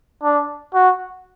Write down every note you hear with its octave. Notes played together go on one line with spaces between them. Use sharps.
D4
F#4